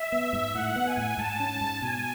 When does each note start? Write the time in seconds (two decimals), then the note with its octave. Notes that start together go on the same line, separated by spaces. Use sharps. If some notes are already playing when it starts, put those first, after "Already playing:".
Already playing: E5
0.12 B3
0.33 G#2
0.54 A2 F#5
0.76 B3
0.87 G#5
0.97 A2
1.18 G#2 A5
1.40 C#4
1.61 G#2
1.82 B2 G#5